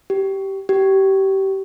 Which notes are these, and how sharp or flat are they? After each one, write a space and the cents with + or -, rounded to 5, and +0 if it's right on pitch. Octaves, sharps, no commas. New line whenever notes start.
G4 -15
G4 -25